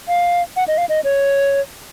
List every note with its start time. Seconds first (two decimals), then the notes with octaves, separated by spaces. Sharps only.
0.08 F5
0.57 F#5
0.68 D#5
0.78 F5
0.89 D#5
1.04 C#5